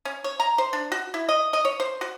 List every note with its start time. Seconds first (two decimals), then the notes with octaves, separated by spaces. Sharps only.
0.05 C#4
0.24 C#5
0.40 A#5
0.58 C5
0.73 D4
0.92 F#4
1.14 E4
1.29 D#5
1.53 D#5
1.65 C#5
1.80 C5
2.01 F#4